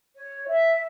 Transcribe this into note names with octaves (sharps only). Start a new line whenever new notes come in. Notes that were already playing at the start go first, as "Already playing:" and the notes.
C#5
E5